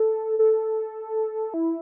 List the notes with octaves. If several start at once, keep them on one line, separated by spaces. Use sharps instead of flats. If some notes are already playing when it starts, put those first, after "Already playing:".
Already playing: A4
A4
E4